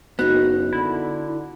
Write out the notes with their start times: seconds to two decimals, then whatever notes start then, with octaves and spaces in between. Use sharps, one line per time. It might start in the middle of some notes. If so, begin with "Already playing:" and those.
0.19 F#1 B3 D#4 F#4 F#6
0.73 D3 E4